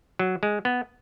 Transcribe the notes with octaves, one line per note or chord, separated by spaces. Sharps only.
F#3
G#3
B3